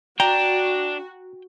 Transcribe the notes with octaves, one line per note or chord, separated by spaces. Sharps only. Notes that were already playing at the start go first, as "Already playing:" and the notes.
D4 F#4 G5 A#5